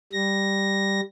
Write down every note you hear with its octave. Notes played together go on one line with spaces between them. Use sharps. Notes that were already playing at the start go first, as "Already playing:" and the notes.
G3 A#6